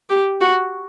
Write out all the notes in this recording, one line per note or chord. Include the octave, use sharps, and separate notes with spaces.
G4
F#4